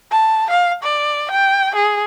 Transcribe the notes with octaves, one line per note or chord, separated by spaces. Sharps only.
A5
F5
D5
G5
G#4